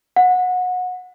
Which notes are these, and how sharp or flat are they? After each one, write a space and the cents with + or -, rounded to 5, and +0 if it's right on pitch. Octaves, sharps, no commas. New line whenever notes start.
F#5 -25